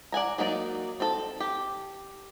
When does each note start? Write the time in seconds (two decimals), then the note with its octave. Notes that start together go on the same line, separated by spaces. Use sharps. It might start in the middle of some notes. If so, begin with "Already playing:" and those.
0.12 D5 F#5 G#5 A#5
0.38 F#3 A#3 D#4 F#4 D5
1.00 C4 A4
1.40 G4